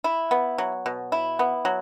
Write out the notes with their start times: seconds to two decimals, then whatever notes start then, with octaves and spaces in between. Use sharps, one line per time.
0.04 E4
0.31 B3
0.58 F#3
0.86 B2
1.12 E4
1.39 B3
1.65 F#3